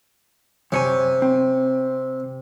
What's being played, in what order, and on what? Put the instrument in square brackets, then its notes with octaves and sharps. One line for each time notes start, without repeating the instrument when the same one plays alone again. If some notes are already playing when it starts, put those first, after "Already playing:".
[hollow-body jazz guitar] F#2 C#5 G#5 [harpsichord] C3
[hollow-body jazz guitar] C4